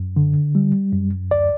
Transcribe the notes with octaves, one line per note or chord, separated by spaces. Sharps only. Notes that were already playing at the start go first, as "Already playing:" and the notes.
Already playing: F#2
D3
G3
F#2
D2 D5